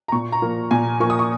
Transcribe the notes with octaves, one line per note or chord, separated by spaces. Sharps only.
A#5
A#2 C#6
A#5
F3 A#3
A#2 G#5
F3 A#3 C#6
D#6
C#6